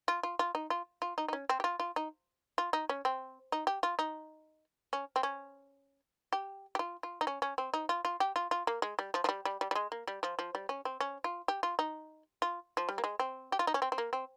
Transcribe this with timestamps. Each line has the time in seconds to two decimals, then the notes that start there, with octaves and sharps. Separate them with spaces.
0.08 F4
0.23 F4
0.39 F4
0.55 D#4
0.70 F4
1.02 F4
1.18 D#4
1.28 D#4
1.33 C#4
1.49 C4
1.60 G4
1.64 F4
1.80 F4
1.96 D#4
2.58 F4
2.73 D#4
2.89 C#4
3.05 C4
3.52 D#4
3.67 G4
3.83 F4
3.99 D#4
4.93 C#4
5.16 C4
5.23 C#4
6.33 G4
6.75 G4
6.79 F4
7.03 F4
7.21 D#4
7.27 C#4
7.42 C#4
7.58 C4
7.74 D#4
7.89 F4
8.05 F4
8.20 G4
8.36 F4
8.51 F4
8.67 A#3
8.82 G#3
8.99 G3
9.14 F3
9.24 F3
9.29 G3
9.45 G3
9.61 G3
9.71 G3
9.75 G#3
9.92 A#3
10.08 G3
10.23 F3
10.39 F3
10.55 G3
10.69 C#4
10.85 C4
11.00 C#4
11.24 F4
11.48 G4
11.63 F4
11.79 D#4
12.42 F4
12.77 F3
12.89 G3
12.98 A#3
13.04 G#3
13.19 C4
13.52 G4
13.59 F4
13.67 D#4
13.74 C#4
13.82 C4
13.92 C4
13.98 A#3
14.13 C4